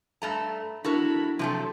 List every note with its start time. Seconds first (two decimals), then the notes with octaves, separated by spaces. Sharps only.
0.22 G2 A3 A#5
0.84 D4 E4 F#4 A4 A#4 B5
1.39 C3 F3 F#3 A3 A4